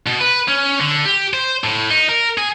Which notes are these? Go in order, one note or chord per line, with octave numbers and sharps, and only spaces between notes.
B2
B4
C#4
D3
G4
C5
A2
D#4
A#4
G#4